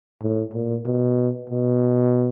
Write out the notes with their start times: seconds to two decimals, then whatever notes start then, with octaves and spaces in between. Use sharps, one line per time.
0.22 A2
0.54 A#2
0.86 B2
1.49 B2